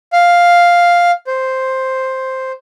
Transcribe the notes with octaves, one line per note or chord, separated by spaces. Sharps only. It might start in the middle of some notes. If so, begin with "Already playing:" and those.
F5
C5